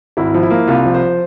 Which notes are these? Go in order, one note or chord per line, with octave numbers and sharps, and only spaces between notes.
G#1 E4
F3
E4
A#3
C2 F4
F3
C5